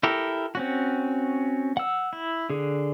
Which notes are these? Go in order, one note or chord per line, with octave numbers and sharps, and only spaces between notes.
E4 G4 A4 A#4
C4 C#4 F#4
F#5 E6
E4
D3 G#4